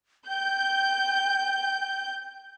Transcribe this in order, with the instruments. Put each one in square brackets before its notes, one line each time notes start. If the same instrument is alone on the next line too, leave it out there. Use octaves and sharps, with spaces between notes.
[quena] G5 [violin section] G6